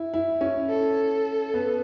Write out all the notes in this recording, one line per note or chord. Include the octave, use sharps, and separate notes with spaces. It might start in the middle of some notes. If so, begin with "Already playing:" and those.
Already playing: E4
E4
C#4
A4
B3